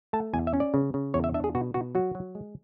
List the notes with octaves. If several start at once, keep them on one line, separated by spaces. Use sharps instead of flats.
A3 A5
E2 G#5
E5
C#4
D5
C#3
C#3
E2 C#5
E5
D4 E5
G#4
B2 F#4
B2 F#4
F#3 F#4
F#3
G#3